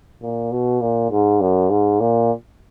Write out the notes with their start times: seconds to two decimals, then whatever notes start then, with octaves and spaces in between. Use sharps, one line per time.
0.22 A#2
0.52 B2
0.81 A#2
1.11 G#2
1.41 F#2
1.70 G#2
2.00 A#2